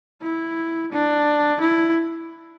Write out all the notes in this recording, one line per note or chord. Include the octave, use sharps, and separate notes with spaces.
E4
D4
E4